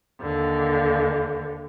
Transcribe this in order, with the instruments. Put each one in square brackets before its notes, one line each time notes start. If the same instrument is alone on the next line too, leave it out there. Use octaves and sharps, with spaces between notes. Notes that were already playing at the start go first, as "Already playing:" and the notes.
[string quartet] D#2 D3